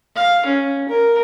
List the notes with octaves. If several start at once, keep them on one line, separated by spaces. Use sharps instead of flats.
F5
C#4
A#4